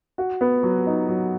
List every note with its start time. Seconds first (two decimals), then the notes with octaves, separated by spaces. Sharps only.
0.18 F#4
0.41 B3
0.63 F#3
0.87 D#4
1.09 F#3